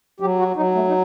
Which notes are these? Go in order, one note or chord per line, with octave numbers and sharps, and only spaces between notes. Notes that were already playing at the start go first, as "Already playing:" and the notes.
F#3 G4
F#4
F#3 D#4
A3
D#4